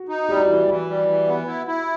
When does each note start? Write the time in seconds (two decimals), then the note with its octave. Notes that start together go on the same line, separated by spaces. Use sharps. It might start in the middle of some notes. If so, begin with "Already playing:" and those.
Already playing: F#4
0.09 D#4
0.29 G3 G4
0.37 F#4
0.46 E3 E4
0.54 F#4
0.68 E3 F#4
0.88 G3
1.08 E3
1.27 B3
1.47 E4
1.67 E4